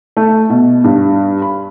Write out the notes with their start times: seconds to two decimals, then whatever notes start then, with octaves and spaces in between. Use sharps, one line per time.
0.17 A3
0.50 B2
0.84 G2
1.42 B5